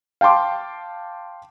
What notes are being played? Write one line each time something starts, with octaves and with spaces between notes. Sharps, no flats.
F5 G5 A5 C6 D6